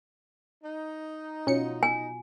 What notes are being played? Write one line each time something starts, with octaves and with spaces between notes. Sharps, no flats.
D#4
B2 C#4 F4 F#4 C#7
G#5